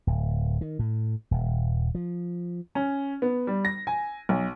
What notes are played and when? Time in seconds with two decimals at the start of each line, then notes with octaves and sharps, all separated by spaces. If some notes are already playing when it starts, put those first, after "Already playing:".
0.07 D1
0.61 D#3
0.79 A2
1.31 D#1
1.95 F3
2.75 C#4
3.22 B3
3.47 G3
3.65 A#6
3.87 G#5
4.29 B1